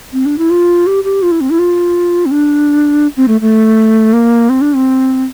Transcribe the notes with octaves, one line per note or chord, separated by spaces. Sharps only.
C4
D4
E4
F4
G4
G4
F4
E4
C4
E4
F4
C4
D4
C4
A3
A3
A#3
C4
D4
C4